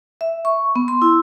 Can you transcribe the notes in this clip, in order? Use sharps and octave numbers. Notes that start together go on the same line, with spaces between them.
E5
C#6
B3
C6
E4